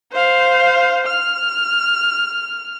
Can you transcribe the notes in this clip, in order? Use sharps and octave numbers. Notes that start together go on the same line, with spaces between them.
C5 F5
F6